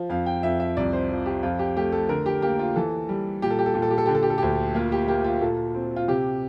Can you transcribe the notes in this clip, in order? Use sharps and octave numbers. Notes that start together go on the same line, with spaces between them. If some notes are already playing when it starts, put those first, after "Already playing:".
Already playing: F3
F2 F5
G5
F2 E5
E5
C2 D5
C5
F3
G4
F2 F4
G4
A3 G4
A4
D3 A#4
G4
A#3 G4
F4
E3 A4
G3
A#2 G4
A4
G4
A4
A#2 G4
A4
G4
A4
D3 G4
A4
G4
A4
D2 G4
A#3 F4
G4
A#3 G4
F4
A#2 A4
C4
F4
C3 G4